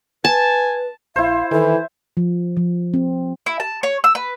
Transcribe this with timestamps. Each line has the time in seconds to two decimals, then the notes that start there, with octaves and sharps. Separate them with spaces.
0.25 B4 G#5 A5
1.16 A#1 E4 C5 F5
1.51 D#3 E3 A4
2.17 F3
2.57 F3
2.94 C4
3.46 E4
3.60 A5
3.83 C#5
4.04 E6
4.15 B4